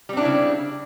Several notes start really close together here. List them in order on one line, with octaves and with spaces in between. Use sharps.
G3 C4 D4 E4 C#3